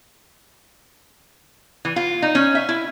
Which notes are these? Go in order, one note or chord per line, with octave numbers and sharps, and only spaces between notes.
E3
F4
D#4
C#4
E5
E4